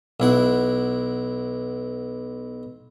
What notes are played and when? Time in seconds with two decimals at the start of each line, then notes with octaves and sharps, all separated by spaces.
0.20 B1 E4 F#5